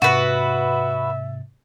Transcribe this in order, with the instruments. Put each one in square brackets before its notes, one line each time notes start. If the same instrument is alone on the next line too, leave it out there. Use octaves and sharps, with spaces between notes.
[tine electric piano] G#2 C3 A6 [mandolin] F#4 B4 [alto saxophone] E5